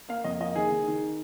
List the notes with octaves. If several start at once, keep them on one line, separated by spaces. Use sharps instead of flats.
A#3 F5
F2 D#5
A#3 D#5
D#3 G#4
D#3
D#3